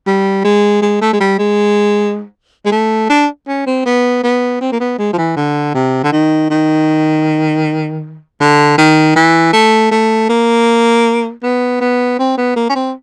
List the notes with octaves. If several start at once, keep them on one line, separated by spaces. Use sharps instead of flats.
G3
G#3
G#3
A3
G#3
G3
G#3
G#3
A3
D4
C#4
C4
B3
B3
C4
A#3
B3
G#3
F3
E3
D3
C3
D3
D#3
D#3
D3
D#3
E3
A3
A3
A#3
B3
B3
C4
B3
A#3
C#4
C4